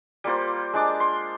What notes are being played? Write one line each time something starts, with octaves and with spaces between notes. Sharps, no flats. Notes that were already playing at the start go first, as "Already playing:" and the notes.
G3 A#3 F4 C5
G#3 D4 D6
C6